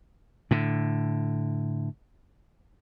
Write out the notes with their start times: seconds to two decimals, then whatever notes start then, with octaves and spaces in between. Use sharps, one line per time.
0.51 A2 D3